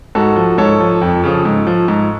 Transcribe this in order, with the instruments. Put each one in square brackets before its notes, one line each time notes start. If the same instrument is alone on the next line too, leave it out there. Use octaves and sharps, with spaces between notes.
[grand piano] G#2 F#4 A4
F3
G#2 A4 C#5
F3
F2
C#3 F3
G#2
F3
G#2